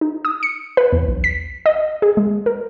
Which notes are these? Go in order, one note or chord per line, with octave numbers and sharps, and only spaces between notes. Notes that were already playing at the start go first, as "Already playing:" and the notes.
D#4
D#6
C#7
B4
E2
B1
B6
D#5
G#4
G#3
A#4